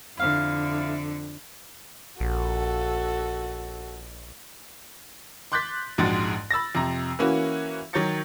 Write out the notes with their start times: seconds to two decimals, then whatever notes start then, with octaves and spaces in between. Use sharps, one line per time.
0.17 F2 D3 E4 F5
2.20 A#1 F#4 A4
5.52 C6 D6 F#6 G6 A6 B6
5.98 A#1 F2 G#2 G#3 F#4 A6
6.51 B5 E6 A6 A#6
6.75 F2 C3 A#5
7.19 E3 A#3 C#4 E4 F#4
7.93 D#3 F#3 C#5 G6 A6 C#7